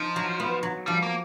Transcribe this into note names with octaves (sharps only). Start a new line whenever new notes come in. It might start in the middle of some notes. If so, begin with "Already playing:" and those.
Already playing: F3 D#4
F#3
B3
F#3
F3 G3
A#3